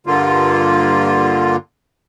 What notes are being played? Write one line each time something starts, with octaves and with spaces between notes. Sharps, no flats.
G2 D3 A#3 F4